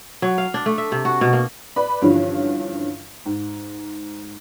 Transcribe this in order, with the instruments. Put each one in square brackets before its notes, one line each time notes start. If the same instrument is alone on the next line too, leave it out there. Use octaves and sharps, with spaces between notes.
[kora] F#3
F5
D4
A3
E5
C3
F#4
B2
A#3
[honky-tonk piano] B4 D5 B5
G2 D3 E3 F3 C#4 F4
G#2